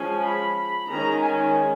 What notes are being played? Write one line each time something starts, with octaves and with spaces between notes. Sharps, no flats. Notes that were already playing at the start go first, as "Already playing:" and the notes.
Already playing: F3 G#3 C#4 G#5
B5
D#3 G#3 C#4 A#5
G#5